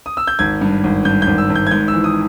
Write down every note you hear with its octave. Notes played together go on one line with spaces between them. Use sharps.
D#6
E6
G6
G#1 G#6
G2
G#1
G2 G6
G6
G#1
E6
G#1
G6
G#6
G#2 G6
E6
E3
D#6